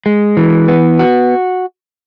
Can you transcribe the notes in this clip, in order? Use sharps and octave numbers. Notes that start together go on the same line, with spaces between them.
G#3
E3
B3
F#4